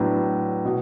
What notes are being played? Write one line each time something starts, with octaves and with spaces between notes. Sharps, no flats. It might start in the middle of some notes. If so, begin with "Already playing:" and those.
Already playing: A2 F#3 B3 D4
B2